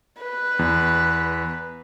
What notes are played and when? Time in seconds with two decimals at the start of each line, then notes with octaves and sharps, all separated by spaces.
0.21 B4
0.59 E2